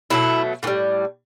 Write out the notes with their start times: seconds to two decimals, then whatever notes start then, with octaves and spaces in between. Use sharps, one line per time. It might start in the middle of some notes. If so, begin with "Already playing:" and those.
0.10 B2 F#3 A3 E4
0.63 A2 E3
0.67 G3